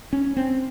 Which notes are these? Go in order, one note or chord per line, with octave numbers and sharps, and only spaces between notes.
C#4
C4